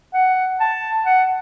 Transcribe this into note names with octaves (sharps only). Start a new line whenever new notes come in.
F#5
A5
F#5